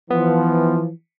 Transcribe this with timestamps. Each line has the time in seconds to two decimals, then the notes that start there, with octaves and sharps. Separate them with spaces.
0.10 E3 F3 B3